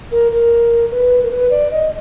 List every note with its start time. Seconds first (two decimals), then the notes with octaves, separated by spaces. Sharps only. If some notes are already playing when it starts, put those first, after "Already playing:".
0.12 A#4
0.32 A#4
0.91 B4
1.23 A#4
1.31 B4
1.51 D5
1.71 D#5